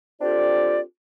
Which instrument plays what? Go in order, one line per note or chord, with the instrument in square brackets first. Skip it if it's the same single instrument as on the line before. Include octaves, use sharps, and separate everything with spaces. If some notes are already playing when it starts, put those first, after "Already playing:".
[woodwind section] C4 D4 F4 G4 A4 D5